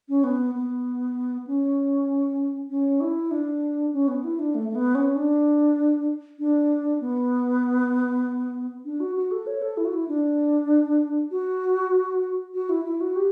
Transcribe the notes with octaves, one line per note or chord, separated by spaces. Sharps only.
C#4
B3
B3
C#4
C#4
E4
D4
C#4
B3
E4
D4
A3
A3
B3
C#4
D4
D4
B3
D4
F#4
F#4
A4
C#5
A4
E4
F#4
E4
D4
F#4
F#4
E4
E4
F#4
G4